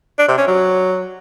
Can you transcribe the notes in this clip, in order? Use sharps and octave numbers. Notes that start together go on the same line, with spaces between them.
D4
C3
C#4
F#3